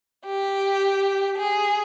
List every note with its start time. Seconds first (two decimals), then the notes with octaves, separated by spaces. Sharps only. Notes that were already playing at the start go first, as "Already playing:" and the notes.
0.25 G4
1.38 G#4